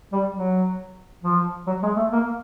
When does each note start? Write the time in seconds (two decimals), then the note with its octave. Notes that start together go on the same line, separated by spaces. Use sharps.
0.12 G3
0.35 F#3
1.23 F3
1.67 F#3
1.83 G#3
1.96 A3
2.12 A#3